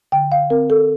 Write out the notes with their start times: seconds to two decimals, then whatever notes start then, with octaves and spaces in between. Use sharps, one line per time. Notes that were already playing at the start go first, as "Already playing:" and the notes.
0.12 D3 G5
0.32 F5
0.50 C4 A#4
0.70 A4